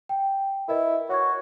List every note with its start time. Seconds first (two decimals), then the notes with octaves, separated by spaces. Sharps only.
0.09 G5
0.68 E4 A#4 B4 D#5
1.09 F#4 C#5 C#6 G#6